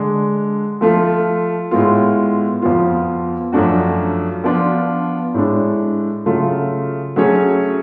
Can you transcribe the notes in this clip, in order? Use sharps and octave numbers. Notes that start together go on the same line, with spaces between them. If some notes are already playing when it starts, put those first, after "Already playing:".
Already playing: D3 G#3 D4
F3 A3 F4 A4
A2 G#3 B3 F4
F2 F3 B3 F4
F#2 F3 A3 D4 F#4
F3 B3 D4 F4
A2 G#3 D4
C#3 F#3 A3 F4
F#3 A3 C#4 G#4 C#5